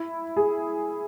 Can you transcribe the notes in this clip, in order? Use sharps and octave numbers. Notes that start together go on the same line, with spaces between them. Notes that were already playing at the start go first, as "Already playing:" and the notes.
Already playing: E4
G#4